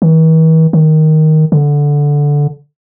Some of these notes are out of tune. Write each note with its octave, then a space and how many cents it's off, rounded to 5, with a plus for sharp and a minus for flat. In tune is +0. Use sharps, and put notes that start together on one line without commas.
E3 -45
D#3 +5
D3 -10